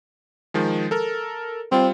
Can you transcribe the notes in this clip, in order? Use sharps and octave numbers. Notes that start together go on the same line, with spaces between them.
D#3 F3 G#3
A4 A#4
G3 C4 F4